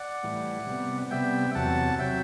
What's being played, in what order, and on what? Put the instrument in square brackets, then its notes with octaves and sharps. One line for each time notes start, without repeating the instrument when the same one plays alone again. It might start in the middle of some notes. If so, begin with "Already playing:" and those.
Already playing: [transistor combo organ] D5 F#5
A2 E3 G3
C3 G3 B3
C3 G3 B3 E5 G5
E2 C3 F#3 F#5 A5
C3 F#3 E5 G5